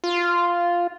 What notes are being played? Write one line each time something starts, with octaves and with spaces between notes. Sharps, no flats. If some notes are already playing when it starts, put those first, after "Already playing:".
F4